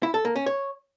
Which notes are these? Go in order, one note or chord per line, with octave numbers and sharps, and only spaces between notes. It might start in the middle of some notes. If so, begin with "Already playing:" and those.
E4
A4
A#3
C#4
C#5